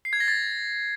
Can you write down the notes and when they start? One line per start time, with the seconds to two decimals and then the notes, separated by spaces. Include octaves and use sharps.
0.05 C7
0.13 G#6
0.20 A#6
0.28 A6